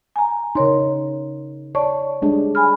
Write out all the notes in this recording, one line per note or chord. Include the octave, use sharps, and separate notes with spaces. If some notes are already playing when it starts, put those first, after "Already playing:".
G#5 A#5
C#3 D#4 A#4 C#5 C6
C#5 D5 A5 C#6
G3 G#3 D4
G#5 B5 F6